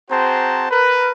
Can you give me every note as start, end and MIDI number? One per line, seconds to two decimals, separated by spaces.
0.10 0.67 60
0.10 0.67 66
0.10 0.67 68
0.10 0.67 72
0.10 0.67 81
0.10 0.67 82
0.70 1.12 70
0.70 1.12 71